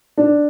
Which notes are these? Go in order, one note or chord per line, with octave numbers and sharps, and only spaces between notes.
D4